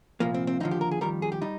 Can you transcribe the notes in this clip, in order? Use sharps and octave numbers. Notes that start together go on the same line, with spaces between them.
C2 A#2 F3 A#3
C4
C4
D#2 D3 F3 D#4
G4
A#4
G#4
F2 D#3 G3 A#4
G#4
G4
G3 D#4